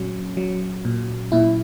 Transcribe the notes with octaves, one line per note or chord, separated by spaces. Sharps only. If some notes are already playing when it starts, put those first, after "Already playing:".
Already playing: A#2 F#3 C#4
F#3
A#2
A#2 E4